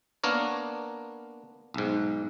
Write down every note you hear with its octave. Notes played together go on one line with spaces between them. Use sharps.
A#3 B3 D4 A#4 C#5
B1 G#2